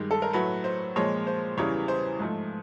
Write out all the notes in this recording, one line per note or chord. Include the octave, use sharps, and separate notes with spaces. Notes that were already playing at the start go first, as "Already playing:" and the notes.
Already playing: G2 D#3 G#3
A4
A#4
A2 F#3 A3 B4
C5
A#2 F3 G#3 C#5
C5
E2 C#3 E3 G3 C#5
C5
G#2 F3 A3